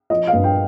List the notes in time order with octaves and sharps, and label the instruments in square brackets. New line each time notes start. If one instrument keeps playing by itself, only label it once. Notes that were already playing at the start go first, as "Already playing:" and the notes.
[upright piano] F3 D#5
F5
G2
G5